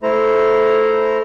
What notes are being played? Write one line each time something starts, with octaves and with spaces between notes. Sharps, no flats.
A3 E4 C5 A#5